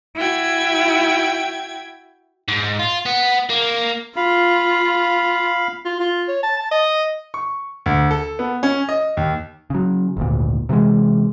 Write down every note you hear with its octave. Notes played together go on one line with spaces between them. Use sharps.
E4 F#4 G5 G#6
G#2
F4
B3
A#3
F4 F5 B5
F4
F4
C#5
A5
A5
D#5
C#6
D2
A4
B3
C#4
D#5
D#2
C#3 F#3
G#1 D2 A#2
C3 E3 F3 G#3